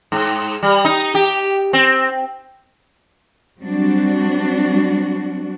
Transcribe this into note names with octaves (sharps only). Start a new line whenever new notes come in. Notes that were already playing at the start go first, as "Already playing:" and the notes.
G#2
G3
D#4
G4
C4
F#3 G3 C4 D4 F#4